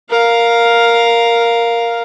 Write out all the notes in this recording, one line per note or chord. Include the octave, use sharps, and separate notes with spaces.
A#4 F5